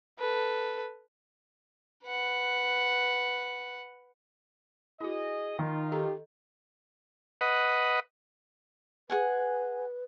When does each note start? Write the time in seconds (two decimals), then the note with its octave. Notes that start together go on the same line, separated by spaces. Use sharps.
0.19 A4 B4
2.05 B4 F#5
5.01 E4 F#4 G#4 D#5
5.59 D#3 D#4 F4
5.92 G4 A4 D#5 A#5
7.41 B4 D#5 F#5
9.10 G#4 B4 F#5 G#5